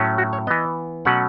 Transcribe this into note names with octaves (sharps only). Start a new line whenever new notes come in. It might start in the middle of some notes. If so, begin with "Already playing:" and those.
Already playing: A2 F#3 A3 C#4
F#4
C#5
E3 B3 D#5
B2 F#3 A3 C#4 F#5